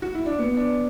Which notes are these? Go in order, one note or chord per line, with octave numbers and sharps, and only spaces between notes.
F#4
E4
D4
B3
D4